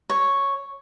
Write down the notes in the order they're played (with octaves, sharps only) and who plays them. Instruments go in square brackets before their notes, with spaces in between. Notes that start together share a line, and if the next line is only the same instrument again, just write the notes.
[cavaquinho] C#5